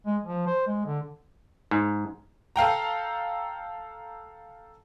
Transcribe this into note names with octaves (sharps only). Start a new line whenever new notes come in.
G#3
F3
C5
G#3
D3
G#2
A4 F5 G5 A#5